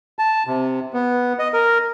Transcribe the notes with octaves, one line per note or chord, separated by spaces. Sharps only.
A5
C3
B3
D#5
A#4